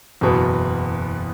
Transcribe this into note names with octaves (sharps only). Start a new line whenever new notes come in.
F#1 E2 B2 B3